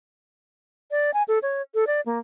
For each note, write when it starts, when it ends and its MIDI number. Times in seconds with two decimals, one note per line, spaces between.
0.91 1.13 74
1.14 1.23 80
1.28 1.39 69
1.42 1.62 73
1.74 1.85 69
1.87 2.01 74
2.06 2.19 58